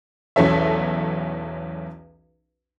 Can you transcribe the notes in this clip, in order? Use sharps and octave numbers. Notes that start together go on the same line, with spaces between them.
B1 E2 F#3 C#4 A4 E5